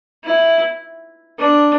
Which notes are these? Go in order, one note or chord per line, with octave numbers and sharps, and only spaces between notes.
E4
D4